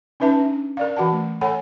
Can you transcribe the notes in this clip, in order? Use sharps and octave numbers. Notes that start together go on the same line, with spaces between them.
C#4 D#4 B4 E5 A5
D4
A#4 D5 F5
E3 F#4 F#5 A5
A3
A4 C#5 F#5 G#5 B5